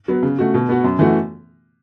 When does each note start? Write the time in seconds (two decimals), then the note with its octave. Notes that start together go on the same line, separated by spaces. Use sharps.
0.08 F#3 B3
0.23 C#3
0.38 A3 F#4
0.54 B2
0.69 B3 F#4
0.84 F#2
0.99 E3 A3 F#4